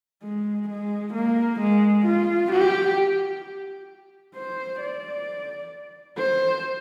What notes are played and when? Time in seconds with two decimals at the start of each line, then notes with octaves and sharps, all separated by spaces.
0.23 G#3
0.69 G#3
1.14 A#3
1.61 G#3
2.06 F4
2.52 G4
4.35 C5
4.81 D5
6.19 C5